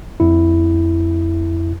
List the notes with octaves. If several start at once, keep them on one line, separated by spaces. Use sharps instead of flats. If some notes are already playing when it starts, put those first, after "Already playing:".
F2 E4